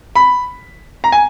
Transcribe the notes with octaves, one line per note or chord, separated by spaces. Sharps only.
B5
A#5
G#5